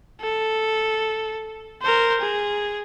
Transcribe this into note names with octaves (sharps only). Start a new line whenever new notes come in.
A4
A#4 C5
G#4